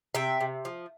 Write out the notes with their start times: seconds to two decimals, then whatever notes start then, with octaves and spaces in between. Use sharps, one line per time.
0.15 C3 E5 G5
0.41 C3
0.65 F3